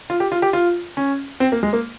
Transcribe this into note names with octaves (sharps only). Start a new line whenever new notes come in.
F4
G4
F4
G4
F4
C#4
C4
A#3
G#3
A#3